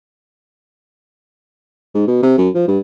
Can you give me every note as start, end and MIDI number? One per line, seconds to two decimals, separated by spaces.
1.95 2.07 44
2.08 2.22 47
2.23 2.35 48
2.38 2.49 42
2.55 2.66 53
2.68 2.79 43